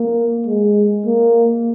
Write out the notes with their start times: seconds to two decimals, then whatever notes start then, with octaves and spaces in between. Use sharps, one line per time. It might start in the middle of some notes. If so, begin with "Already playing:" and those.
Already playing: A#3
0.47 G#3
1.06 A#3